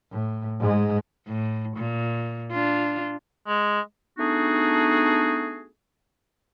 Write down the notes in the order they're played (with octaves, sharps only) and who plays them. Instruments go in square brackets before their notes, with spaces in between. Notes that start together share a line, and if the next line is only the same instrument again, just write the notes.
[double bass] A2
G#2 G#3
[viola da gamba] A2
A#2
D4 F4
[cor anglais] G#3
[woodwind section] A3 B3 D4 D#4 F#4 G#4